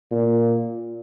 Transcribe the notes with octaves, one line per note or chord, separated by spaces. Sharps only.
A#2